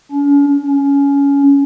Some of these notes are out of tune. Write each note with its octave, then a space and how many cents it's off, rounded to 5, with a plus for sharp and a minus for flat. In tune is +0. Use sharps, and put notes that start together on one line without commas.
C#4 +40
C#4 +20